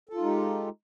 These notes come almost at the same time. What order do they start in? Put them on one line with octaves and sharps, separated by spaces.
A4 F4 D#4 G#3 G4